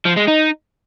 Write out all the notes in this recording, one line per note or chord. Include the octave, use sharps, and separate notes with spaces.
F3
G#3
D#4